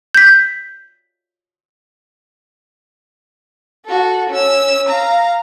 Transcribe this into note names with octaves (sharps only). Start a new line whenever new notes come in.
G6 B6
F#4 A4
C#4 E6
F5 A#5